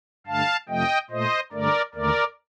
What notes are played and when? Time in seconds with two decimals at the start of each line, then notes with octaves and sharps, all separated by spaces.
0.27 G2 D3 A3 F5 A5
0.69 F2 C3 F3 A3 D#5 G5
1.11 A#2 A3 C5 D#5
1.52 G2 D3 A3 A#4 D5
1.94 D#2 D3 A3 A#4 D5